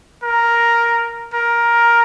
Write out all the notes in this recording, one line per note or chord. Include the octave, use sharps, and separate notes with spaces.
A#4
A#4